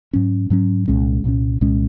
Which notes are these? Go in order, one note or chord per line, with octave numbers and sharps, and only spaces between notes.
G#2 F#3 C#4
G#2 F#3 C#4
C2 A#2 G#3 C#4
C2 A#2 G#3 C#4
C2 A#2 G#3 C#4